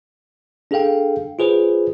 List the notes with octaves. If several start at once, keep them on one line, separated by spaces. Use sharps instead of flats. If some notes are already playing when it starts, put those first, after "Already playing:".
D4 G#4 A4 F5 G5
F4 G#4 B4 C5